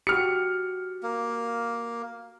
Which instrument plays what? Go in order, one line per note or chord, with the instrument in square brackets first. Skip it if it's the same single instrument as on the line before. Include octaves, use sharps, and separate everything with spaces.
[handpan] F#4 G4 [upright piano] F6 C#7
[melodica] A#3